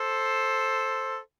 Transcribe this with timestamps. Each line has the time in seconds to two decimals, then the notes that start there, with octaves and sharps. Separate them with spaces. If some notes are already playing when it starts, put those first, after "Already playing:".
Already playing: A4 C5